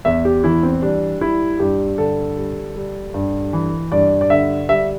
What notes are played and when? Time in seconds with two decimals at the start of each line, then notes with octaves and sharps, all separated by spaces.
0.05 E2 E5
0.25 G4
0.44 E3 E4
0.63 C4
0.82 G3 D4
1.21 G3 E4
1.60 G2 G4
1.98 D3 A4
2.37 G3
2.76 G3
3.14 G2
3.53 E3
3.92 G2 D5
4.21 D5
4.30 D3 E5
4.69 G3 E5